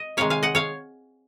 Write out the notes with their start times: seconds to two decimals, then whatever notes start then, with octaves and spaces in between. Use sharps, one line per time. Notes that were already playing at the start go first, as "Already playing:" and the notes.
Already playing: D#5
0.17 C3 D#3 G#3 C#5 F5
0.30 F5 G#5
0.43 D#5 F#5
0.55 C#5 F5